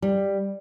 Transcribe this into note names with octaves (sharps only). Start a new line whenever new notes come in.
G3